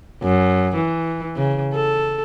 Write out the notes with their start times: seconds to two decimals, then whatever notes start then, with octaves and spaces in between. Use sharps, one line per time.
0.23 F#2
0.75 E3
1.36 C#3
1.74 A4